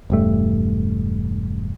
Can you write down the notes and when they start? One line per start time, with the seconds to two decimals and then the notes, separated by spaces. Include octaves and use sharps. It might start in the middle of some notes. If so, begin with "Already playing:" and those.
0.10 E1 G2 A3